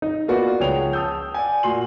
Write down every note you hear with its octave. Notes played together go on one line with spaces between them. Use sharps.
D#4
A#3 B3 F4 F#4 B4 D5
C#2 F3 G#4 C#5 G5 F7
A5 D#6 E6 G6
D5 F#5 G#5
A#2 F#4 C6 F#7